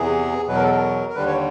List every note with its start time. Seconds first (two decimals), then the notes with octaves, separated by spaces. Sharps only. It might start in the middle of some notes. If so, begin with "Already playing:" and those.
Already playing: E2 C3 E3 G#4
0.47 E2 B2 F#3 B4
0.55 A#4
0.64 A4
0.71 A#4
1.09 A#4
1.15 D#2 D3 G3 B4
1.27 C#5